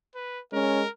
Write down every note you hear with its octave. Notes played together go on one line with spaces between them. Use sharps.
B4
G#3 C#4 A#4